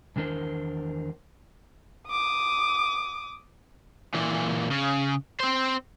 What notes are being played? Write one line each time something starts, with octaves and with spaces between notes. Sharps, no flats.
E2 D#3 D4 A#4 C5
D6 D#6
A#2 E3
C#3
C4 C5